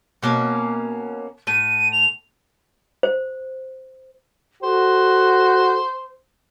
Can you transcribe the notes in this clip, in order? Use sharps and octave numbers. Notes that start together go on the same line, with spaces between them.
B2 A#3 C#4
A2 D#7
F7
C5
F#4 A4 C5